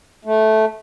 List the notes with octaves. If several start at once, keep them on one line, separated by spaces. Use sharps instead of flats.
A3